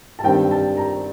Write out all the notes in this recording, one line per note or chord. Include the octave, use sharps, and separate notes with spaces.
A5
G2 D#3 G3 C4 G5
A5
A#5